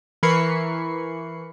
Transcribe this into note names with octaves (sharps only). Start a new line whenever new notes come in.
E3 A#4 B5 C#6 C7 C#7